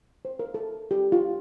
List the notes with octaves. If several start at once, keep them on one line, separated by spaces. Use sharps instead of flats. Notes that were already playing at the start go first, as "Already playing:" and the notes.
C5
A#4
A4
G4
F4